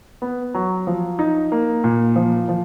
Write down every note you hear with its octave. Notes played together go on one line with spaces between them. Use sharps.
B3
F#3
F3
D#4
A#3
A#2
F3
F3